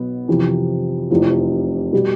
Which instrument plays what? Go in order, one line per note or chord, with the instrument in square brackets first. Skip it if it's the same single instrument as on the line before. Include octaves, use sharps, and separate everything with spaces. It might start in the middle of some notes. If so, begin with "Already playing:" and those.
Already playing: [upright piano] B1 B2 B3
F2 C3 E3
F1 E2 C3 F3
B2 G3